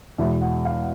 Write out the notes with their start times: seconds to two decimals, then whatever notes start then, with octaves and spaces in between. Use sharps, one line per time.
0.18 E2 B2 G#3 E5
0.41 F#5
0.65 F5